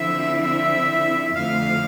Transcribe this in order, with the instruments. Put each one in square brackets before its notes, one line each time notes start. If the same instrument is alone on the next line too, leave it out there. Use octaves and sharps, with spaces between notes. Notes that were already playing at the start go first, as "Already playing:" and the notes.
Already playing: [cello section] D3 F3 C4 E4 [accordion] E5
[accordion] E5
[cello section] F2 D3 F3 A3 [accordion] F5